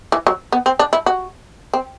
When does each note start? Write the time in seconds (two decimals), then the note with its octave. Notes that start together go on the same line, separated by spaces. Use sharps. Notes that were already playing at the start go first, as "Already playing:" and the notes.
0.12 E3
0.27 F#3
0.52 B3
0.66 C4
0.79 D4
0.93 E4
1.06 F#4
1.74 C4